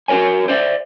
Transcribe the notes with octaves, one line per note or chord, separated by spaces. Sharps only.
C#4 F#4 A#4 C#5 G#5
C5 D5 E5